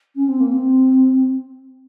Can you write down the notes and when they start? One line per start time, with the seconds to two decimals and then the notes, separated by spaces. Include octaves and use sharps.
0.15 C#4
0.28 C4
0.40 A#3
0.52 C4